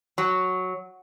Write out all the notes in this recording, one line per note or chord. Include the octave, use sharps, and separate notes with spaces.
F#3